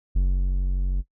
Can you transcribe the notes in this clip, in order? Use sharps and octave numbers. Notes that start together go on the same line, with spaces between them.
F#1